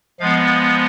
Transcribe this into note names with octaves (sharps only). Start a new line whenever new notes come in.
F3 G#3 B3 F5